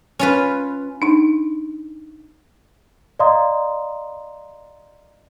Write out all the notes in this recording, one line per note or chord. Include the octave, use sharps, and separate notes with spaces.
C#4 F4 B4
D4 D#4
D5 D#5 F5 A#5 C6 D#6